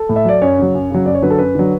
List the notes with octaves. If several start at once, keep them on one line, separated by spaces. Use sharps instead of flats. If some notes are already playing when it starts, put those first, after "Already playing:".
Already playing: A4
A2
E5
F#3 D5
F#2 C#5
C#3 F#3
F#2
C#3 F#3
F#2 D5
C#5
D3 F#3 B4
A4
F#2 B4
D3 F#3